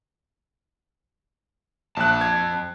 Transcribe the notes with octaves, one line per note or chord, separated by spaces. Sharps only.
A#1 F2 A5 F#6
G#6